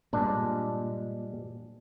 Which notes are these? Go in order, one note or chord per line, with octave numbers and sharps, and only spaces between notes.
G2 A#2 G#3 D4